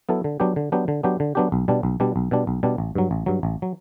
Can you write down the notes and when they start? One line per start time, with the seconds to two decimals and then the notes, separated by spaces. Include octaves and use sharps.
0.09 F#3 B3 E4 A4
0.24 D3
0.40 F#3 B3 D4 G4
0.56 D3
0.72 F#3 B3 D4 G4
0.88 D3
1.03 F#3 B3 D4 G4
1.20 D3
1.35 F#3 B3 D4 G4
1.52 B1
1.68 B2 G3 D4
1.83 B1
2.00 B2 G3 D4
2.16 B1
2.31 B2 G3 D4
2.47 B1
2.63 B2 G3 D4
2.78 A1
2.95 G2 F#3
3.11 A1
3.26 G2 F#3
3.43 A1
3.62 F#3